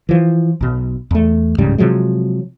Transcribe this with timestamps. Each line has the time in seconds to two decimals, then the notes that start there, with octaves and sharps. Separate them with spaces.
0.09 E3 F3
0.61 B1 B2
1.11 E2 A3
1.58 D1 G#2 C#3 G3
1.78 C3 F3 F#3 G#3